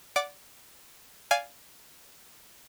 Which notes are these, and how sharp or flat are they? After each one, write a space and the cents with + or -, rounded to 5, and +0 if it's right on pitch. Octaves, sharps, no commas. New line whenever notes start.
D5 -20 F#5 +0 D6 +0
D5 -20 F5 +0 G#5 +0